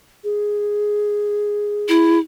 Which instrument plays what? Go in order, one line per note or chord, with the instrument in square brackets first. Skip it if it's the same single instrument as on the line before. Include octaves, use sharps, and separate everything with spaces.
[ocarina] G#4
[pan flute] E4